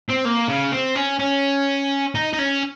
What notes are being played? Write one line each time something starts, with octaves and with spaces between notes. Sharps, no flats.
C4
A#3
C#3
C4
C#4
C#4
D#4
D#4
C#4